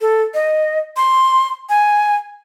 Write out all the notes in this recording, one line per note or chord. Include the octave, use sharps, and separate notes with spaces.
A4
D#5
C6
G#5